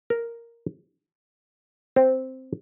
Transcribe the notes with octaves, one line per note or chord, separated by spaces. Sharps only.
A#4
C4